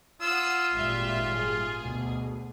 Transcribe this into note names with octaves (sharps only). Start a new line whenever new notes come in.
F4 F#5 D#6 E6
G#1 A#2 G3 E5
G#4
D2 B2